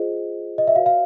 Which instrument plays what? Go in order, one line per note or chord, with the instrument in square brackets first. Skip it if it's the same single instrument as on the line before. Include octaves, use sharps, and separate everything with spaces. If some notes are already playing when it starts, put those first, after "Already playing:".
Already playing: [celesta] F4 G#4 C5 D#5
D#5
E5
F#4 B4 D5 F5
F5